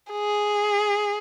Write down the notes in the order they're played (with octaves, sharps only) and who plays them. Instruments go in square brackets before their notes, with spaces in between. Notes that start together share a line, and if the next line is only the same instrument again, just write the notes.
[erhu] G#4